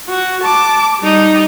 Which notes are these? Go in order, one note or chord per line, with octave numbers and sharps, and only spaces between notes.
F#4
A5 D6
G3 D#4